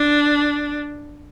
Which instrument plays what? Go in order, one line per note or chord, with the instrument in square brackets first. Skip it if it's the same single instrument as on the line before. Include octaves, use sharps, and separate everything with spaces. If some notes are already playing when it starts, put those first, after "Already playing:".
Already playing: [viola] D4